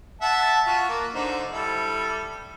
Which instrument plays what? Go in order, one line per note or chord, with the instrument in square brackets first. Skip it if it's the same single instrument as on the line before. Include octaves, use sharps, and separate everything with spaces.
[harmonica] E5 F#5 A5
F4 F#4
A#3
D3 D#4 C5
G3 E4 A4